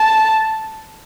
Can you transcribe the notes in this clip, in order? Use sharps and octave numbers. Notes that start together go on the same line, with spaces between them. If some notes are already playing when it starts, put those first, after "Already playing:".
Already playing: A5